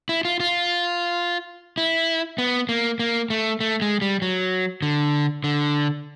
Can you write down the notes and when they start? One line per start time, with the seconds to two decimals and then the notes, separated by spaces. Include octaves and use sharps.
0.09 E4
0.25 F4
0.40 F4
1.78 E4
2.38 B3
2.69 A#3
2.99 A#3
3.30 A3
3.60 A3
3.82 G#3
4.02 G3
4.22 F#3
4.82 D3
5.44 D3